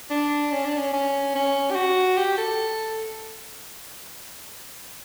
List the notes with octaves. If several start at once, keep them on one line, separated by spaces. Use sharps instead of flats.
D4
C#4
D4
C#4
C#4
C#4
G4
F#4
G4
A4